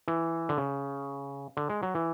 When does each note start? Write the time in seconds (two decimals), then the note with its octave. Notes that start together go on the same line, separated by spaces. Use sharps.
0.08 E3
0.49 D3
0.58 C#3
1.57 D3
1.70 G#3
1.83 F#3
1.95 E3